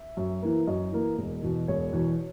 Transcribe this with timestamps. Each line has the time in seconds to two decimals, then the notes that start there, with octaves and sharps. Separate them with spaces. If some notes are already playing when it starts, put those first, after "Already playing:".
Already playing: E5
0.17 F#2
0.42 E3 A#3
0.67 F#2 D#5
0.92 E3 A#3
1.17 E1
1.43 E2 B2
1.68 E1 C#5
1.93 E2 B2